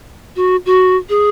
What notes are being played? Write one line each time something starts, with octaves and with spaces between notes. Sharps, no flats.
F#4
F#4
G#4